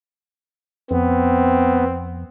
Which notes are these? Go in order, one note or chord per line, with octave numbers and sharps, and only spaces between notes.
F2 B3 C4